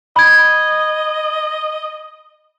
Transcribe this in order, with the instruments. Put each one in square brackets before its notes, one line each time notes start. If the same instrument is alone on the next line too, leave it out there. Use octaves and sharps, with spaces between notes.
[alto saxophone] D#5 [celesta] B5 G#6